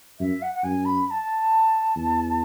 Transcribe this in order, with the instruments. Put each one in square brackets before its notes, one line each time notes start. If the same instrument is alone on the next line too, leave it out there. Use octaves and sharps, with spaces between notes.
[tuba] F#2 [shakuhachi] E5
[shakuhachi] F#5
F#5
[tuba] F#2 [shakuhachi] G#5
[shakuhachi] B5
B5
A5
[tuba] E2